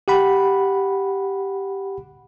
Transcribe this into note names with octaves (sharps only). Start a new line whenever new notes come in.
G4 F#5 B5